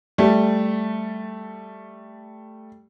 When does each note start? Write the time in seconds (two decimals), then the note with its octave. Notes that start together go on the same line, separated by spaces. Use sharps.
0.18 G3 A3